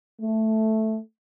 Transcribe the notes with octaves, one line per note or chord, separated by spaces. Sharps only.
A3